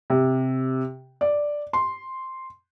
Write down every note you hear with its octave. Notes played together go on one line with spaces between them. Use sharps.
C3
D5
C6